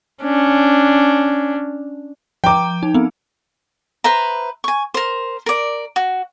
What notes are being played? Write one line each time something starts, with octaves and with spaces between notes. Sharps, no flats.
C#4 D4
F3 G5 A#5 D6
D#4
B3 C4
B4 C5 E5 A#5
G#5 C#6
A#4 C5
A#4 D5
F#4